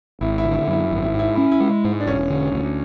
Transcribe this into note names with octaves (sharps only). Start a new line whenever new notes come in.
G#1 E4
E4
D3
E4
F#2 E4
E4
G#1
E4
G#2
E4
C#4 E4
E4
G#3
G#2
D4
E1 C#4
D3
D2